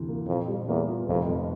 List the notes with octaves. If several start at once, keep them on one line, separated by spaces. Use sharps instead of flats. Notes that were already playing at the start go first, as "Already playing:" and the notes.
Already playing: D2 C3 E3
A#3
F2 A#2
G3
E2 A#3
F4
F1 F2
F2